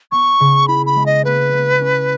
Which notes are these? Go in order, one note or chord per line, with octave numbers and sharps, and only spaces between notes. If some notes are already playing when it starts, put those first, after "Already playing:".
B3 C#6
C#3
E4 B5
B5
G#3
D#5
A#3 B4
A#3
C#4